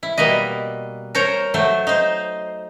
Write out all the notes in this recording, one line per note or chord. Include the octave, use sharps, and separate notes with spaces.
E4
B2 G3 A#3 B4 D#5
A#4 C5 C#5 A#5
F#3 A3 C5
D#4 C5